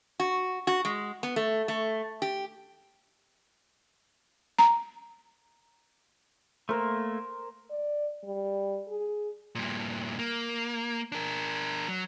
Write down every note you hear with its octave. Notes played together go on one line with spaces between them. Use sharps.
F#4
F#4
G#3
B3
A3
A3
G4
A#5
A3 A#3 A#4 C5
D5
G3
G#4
G2 A#2
A#3
D4 A#4
F#3